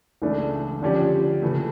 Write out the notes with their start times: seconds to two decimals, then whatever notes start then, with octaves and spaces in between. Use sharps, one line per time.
0.22 C#2 C#3 E3 A3 D4
0.81 D3 F3 C#4 G4 D5
1.42 C#3 E3 A3